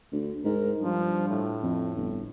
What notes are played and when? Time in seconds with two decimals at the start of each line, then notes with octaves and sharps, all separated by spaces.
0.13 D2
0.45 G#2 A#4
0.82 G2 F3
1.29 A2
1.63 F2
1.97 G1